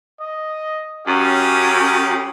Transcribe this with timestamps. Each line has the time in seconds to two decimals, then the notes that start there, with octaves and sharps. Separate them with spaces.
0.20 D#5
1.07 F#2 C#4 G4 F5 D#6